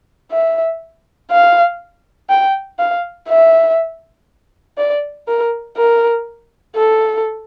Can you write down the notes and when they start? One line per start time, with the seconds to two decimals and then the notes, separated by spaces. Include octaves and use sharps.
0.31 E5
1.30 F5
2.29 G5
2.79 F5
3.28 E5
4.78 D5
5.27 A#4
5.77 A#4
6.76 A4